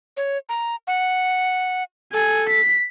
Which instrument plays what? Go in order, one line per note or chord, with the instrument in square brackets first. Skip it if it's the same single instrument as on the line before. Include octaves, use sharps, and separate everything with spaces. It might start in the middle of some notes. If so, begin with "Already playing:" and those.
[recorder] C#5
A#5
F#5
[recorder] A4 [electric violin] G#5
[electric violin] B6